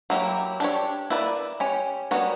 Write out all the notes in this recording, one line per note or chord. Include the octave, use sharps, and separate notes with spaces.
F#3 A#3 E4 G4
D4 G4 C#5
A#3 E4 B4 D5
C#4 G4 C#5
G3 B3 F#4 A#4 C#5